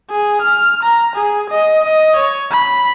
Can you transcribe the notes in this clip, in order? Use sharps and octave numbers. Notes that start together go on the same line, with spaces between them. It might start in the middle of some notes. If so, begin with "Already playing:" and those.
G#4
F6
A#5
G#4
D#5
D#5
C#5
B5